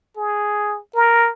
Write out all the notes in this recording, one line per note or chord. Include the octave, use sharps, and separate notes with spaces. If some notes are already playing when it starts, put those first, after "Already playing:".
G#4
A#4